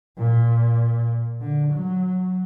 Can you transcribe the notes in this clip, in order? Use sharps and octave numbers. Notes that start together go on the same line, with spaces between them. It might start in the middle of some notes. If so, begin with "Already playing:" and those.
A#2
D3
F#3